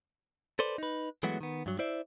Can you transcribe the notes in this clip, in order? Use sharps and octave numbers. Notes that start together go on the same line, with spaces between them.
A4 B4 C5 D5
D#4 B4
E3 F#3 G#3 A3 B3 F#4
D#3 B3
G2 F#3
E4 C5 D5 E5